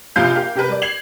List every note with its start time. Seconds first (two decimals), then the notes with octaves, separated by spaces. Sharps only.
0.16 A#1 C3 F4 F5 G6
0.35 G4 A#4 F5
0.55 C3 G4 A#4 B4
0.69 G3 D5
0.82 G#6 C7 F7 F#7